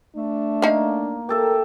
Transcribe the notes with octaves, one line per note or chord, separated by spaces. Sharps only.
A3 D4
A#3 D#4 F5
G4 A4 A#4 E5